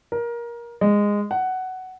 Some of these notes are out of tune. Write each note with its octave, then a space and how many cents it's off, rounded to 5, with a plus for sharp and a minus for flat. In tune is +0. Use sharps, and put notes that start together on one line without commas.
A#4 +20
G#3 -15
F#5 +10